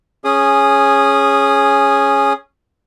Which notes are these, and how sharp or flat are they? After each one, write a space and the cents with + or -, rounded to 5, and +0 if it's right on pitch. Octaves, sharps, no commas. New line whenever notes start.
C#4 -5 G#4 +0 D#6 -15